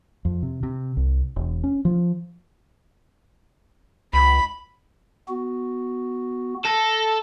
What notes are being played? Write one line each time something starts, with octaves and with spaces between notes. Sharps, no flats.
F2
C3
C3
C2
E1
C#4
F3
C#2 B5
B3 F#4
A4 A#6